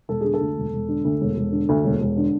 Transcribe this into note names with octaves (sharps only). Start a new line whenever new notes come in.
E1 A4
D3 G#4
A4
D2
E1
E1
D3
D2
E1
E1
D3
D2
E1
E1
D3